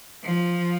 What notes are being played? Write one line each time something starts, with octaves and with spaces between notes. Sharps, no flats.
F3